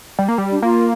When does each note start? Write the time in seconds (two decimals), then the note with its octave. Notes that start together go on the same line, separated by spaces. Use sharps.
0.19 G3
0.28 A#3
0.38 G3
0.51 D4
0.62 A#3 F4